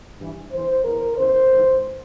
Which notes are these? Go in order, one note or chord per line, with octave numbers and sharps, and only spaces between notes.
G2 E3
E2 E3 C5
E2 E3 A#4
E2 C#3 E3 C5
G#2 E3